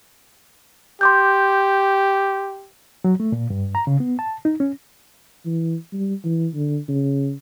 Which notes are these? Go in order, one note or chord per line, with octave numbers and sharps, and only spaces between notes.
G4 C6 D6 G6
F#3
A3
A#2
G2
A#5
C#3
B3
A5
D#4
C#4
E3
G3
E3
D3
C#3